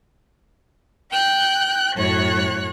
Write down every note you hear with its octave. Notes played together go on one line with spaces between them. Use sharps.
G5 F#6 G6
F#2 A2 C#5 F#6